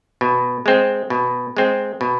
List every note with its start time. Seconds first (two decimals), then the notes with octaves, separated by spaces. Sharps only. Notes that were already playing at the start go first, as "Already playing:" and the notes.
0.21 B2
0.66 G#3 C4
1.10 B2
1.57 G#3 C4
2.01 B2